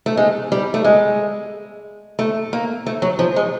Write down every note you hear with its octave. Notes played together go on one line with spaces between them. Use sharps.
A3
G#3
G3
A3
G#3
A3
A#3
A3
F#3
F3
G#3